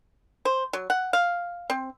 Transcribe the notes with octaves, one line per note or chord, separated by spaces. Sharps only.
C5
F#3
F#5
F5
C4